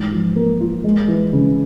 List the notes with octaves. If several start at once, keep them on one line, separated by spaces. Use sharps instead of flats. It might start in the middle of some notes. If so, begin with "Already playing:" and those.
Already playing: G#2 E3
F3
A#3
F4
G#3
E3
C#3